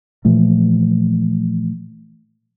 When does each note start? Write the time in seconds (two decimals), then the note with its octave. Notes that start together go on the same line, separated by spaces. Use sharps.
0.25 A#2 E3 F3 A3